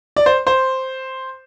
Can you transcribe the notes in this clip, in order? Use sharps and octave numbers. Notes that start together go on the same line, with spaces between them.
D5
C5
C5